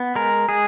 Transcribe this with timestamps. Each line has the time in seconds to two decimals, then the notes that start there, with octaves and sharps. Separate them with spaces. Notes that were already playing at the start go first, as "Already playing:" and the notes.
Already playing: B3
0.15 G#3 A#4
0.49 G#3 G#4